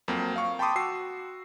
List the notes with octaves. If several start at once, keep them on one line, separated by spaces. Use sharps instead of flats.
F2 F#3 A#3 C4
F5 C#6
G5 A5 B5 C6 D6 D#6
F#4 E6 C7